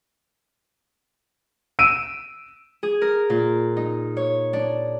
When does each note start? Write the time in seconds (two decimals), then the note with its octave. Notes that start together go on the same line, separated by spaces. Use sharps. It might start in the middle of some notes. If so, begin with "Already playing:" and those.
1.79 E6 D7 D#7
2.83 G#4
3.01 A#4
3.30 A#2
3.77 D#4
4.17 C#5
4.53 D4